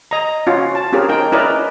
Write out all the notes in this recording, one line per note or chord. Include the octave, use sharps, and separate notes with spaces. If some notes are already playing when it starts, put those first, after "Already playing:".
D#5 A#5
C#4 F4 F#4
A5
C4 C#4 F4 G4 G#4 A#4
D#4 A#4 G5
C#4 E4 A#4 B4 D5 D#5